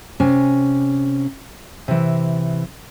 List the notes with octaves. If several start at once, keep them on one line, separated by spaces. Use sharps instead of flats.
C3 C#4 G#5
C3 E3